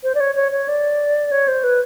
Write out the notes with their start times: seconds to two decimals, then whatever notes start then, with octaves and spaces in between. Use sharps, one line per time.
0.04 C5
0.15 D5
0.20 C#5
0.35 C#5
0.52 C#5
0.68 D5
1.31 C#5
1.48 C5
1.63 B4